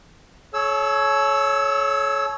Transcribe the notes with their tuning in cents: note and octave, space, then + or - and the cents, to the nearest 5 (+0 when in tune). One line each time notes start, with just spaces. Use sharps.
A4 -45 C#5 +5 E6 +0